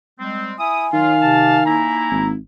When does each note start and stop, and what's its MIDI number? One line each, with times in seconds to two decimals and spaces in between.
0.20 0.54 55
0.20 0.54 56
0.20 0.54 60
0.59 0.88 64
0.59 2.17 80
0.59 0.85 87
0.93 1.84 51
0.93 1.15 54
0.93 1.15 65
0.93 1.65 77
1.22 1.59 48
1.22 1.59 81
1.66 2.32 58
1.66 2.32 63
1.66 2.32 64
1.66 2.27 82
2.10 2.37 32